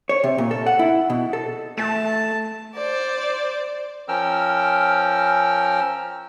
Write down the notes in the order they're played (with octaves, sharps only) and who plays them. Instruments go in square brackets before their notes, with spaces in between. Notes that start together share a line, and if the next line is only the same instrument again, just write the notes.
[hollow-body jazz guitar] C#5
C3
A#2
A4
F#5
E4
B2
A4
[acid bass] A3 [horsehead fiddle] A5
[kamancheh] C5 D5
[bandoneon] F3 C#4 A#4 G5 E6 F6